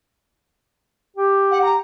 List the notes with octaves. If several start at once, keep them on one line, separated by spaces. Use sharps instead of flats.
G4
F#5
A#5